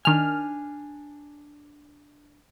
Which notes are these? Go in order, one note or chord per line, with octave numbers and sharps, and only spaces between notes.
D#3 D4 G#5 F6